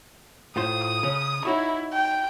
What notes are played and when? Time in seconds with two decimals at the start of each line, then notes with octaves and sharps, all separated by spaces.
0.56 A2 F4 C5 D#6
1.03 C#3 C#4
1.45 D#4 E4 F#4 C#5
1.93 G5